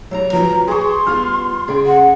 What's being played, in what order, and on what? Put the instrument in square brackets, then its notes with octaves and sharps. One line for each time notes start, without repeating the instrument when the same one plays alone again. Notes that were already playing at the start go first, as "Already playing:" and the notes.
[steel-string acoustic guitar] F#3 G3 A#5
[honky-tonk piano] F3 F#3 [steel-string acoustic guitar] B4 [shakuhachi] A#5
[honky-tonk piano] G#4 C#6 [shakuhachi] C6
[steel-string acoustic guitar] G3 B3 F4 [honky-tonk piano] F6
[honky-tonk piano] C#3 [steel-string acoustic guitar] G#4 D5 G5
[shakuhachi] F#5